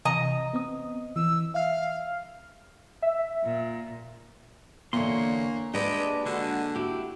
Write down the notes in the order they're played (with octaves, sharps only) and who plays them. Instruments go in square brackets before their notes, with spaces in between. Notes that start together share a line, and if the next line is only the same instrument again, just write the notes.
[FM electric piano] C3 E3 [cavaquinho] D#5 A#5
[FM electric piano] B3 C4 D#6
[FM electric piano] E3 [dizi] E6
[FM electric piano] E5 F6 [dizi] F5
[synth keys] E5
[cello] A#2
[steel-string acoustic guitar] E2 D3 [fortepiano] A#2 [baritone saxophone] A#3 [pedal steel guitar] C#5 C6
[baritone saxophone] G#3 [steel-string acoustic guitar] D4 B4 [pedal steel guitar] G4 D5
[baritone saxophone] D3 [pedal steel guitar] G#3 F#4
[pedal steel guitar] E4 G4 [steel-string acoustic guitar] F#4